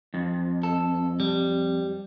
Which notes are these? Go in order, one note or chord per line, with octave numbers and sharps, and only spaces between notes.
F2
A4
G3